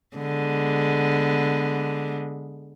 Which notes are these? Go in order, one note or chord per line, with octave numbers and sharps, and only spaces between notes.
D3 G#3 B3